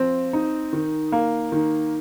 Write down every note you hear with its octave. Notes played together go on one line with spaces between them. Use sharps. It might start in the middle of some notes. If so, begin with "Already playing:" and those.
Already playing: F3 C4
D#4
D#3
A#3
D#3